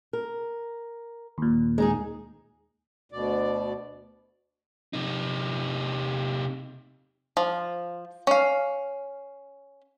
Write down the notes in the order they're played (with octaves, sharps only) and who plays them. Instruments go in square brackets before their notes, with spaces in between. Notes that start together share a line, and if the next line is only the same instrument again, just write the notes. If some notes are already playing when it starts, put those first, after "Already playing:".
[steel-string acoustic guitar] A#4
[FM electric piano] D#2 A#2
[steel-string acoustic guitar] G#3 D#4 G#4
[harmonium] D2 B2 D5
[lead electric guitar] C3 D#4
[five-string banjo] F3
C#4 F5